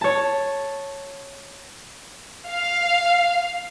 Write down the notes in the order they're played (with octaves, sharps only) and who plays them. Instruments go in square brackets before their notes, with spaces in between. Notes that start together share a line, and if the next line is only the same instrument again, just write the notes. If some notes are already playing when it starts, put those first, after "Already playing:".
[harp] C#5 A5
[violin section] F5